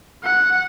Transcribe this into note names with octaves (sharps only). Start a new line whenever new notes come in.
F#5